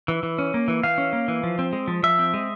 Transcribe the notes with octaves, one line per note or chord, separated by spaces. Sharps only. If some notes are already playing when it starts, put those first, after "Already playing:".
E3
E3
C#4
A#3
E3
E3 F5
C#4
A#3
E3
F3
C4
G#3
F3
F3 E5
C4
G#3